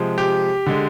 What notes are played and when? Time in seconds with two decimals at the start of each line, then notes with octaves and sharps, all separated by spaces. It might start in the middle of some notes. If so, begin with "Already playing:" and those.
Already playing: C3 F3 G#3
0.18 G4
0.66 D3 G#3